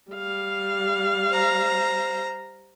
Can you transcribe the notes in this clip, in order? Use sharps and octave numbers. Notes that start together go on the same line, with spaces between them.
G3 F5
C5 A#5